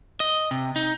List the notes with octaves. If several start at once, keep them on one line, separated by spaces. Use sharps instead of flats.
D#5
C3
D#4